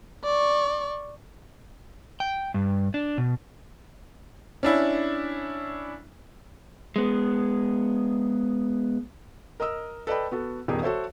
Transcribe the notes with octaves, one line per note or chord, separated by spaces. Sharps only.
D5 C#6
G5
G2
D4
B2
C#4 D4 E4
G#3 B3
A#4 D#5 D#6 E6
A4 B4 D5 D#5 G5 B5
B3 F#4 A4
D#1 E2 D#3 G4 G#4
F#4 A4 C5 C#5 E5